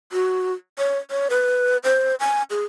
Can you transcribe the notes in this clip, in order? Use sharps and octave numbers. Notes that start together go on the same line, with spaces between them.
F#4
C#5
C#5
B4
C5
G#5
G#4